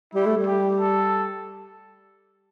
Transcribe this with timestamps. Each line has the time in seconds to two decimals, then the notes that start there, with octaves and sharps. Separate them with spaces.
0.14 G3 E4
0.26 A3
0.37 G3
0.46 G4
0.79 A4